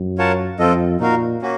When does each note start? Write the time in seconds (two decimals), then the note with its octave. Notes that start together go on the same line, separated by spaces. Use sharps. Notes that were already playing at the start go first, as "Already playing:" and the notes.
Already playing: F#2
0.18 F4 A#4 C#5 F#5 A5
0.59 F2 C4 F4 A4 D#5
1.00 A#2 D#4 F#4 A#4 F5
1.42 A#3 C#4 F#4